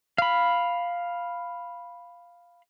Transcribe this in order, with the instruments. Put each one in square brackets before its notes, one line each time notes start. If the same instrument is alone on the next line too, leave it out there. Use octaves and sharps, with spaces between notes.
[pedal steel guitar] F5 B5